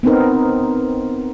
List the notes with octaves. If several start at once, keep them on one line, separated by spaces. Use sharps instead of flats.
B3 C4 D#4 A#4